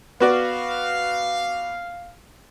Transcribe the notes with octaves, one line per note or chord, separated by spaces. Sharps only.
B3 F#4 D5 F5